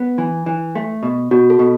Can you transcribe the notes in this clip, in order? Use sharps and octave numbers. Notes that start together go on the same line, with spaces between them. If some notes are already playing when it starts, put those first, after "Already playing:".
Already playing: B3
E3
E3
A3
B2
B2 F#4
A4
B2